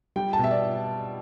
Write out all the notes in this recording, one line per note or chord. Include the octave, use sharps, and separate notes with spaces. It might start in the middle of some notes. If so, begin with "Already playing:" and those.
G3 G5
A5
B2
E5
D5